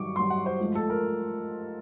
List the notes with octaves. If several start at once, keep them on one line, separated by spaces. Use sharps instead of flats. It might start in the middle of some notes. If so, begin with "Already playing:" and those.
Already playing: G2 D#3 F#3 C#6 D6
G2 D#3 F#3 C6
F#5
C5
G#2 F3 A3
A4
A#4